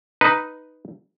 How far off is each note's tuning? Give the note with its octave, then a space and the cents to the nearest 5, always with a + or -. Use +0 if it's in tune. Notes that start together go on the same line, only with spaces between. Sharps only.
D#4 +0 B4 +0